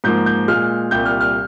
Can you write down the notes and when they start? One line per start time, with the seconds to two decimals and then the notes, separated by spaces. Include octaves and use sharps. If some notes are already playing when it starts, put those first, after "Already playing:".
0.04 G#2 F3 A#3 G6
0.26 G6
0.48 A#2 G#3 F6
0.91 C2 A#2 G3 G6
1.05 F6
1.20 F6